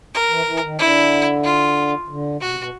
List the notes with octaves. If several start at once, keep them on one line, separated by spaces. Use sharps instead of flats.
A#4
E3
E3
D#3
D3 E4
F4
D3
B2 F#4
C3
B2